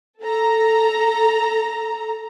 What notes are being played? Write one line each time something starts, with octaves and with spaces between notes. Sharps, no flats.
A4 A#5